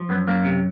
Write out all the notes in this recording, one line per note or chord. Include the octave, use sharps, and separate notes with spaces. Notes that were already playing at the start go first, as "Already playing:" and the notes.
Already playing: F3
F#2 B3
F#2 A#3
C3